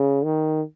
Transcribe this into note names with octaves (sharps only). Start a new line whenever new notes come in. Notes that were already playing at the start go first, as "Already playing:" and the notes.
Already playing: C#3
D#3